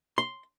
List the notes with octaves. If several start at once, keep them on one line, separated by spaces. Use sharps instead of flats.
C6